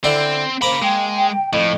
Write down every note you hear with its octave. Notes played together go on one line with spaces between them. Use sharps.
D3 C4 E4
C#3 A#3 C5 F5 A#5 B5 D6
G#3 G5
F2 A2